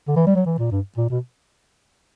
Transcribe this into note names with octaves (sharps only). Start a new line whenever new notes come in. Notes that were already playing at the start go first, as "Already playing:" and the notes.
D3
E3
G3
F#3
E3
A#2
G2
A#2
B2